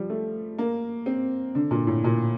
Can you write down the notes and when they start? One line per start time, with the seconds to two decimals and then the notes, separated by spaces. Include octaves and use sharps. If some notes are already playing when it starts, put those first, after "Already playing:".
Already playing: F3 G3
0.10 A3
0.58 A#3
1.06 C4
1.55 D3
1.71 A#2
1.87 A2
2.04 A#2